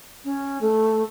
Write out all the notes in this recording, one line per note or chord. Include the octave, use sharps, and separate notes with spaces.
C#4
A3